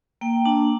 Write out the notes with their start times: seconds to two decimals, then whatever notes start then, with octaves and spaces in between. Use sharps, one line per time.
0.21 A#3 G5
0.45 D4 A5